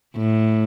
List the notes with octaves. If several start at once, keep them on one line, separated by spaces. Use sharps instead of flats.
A2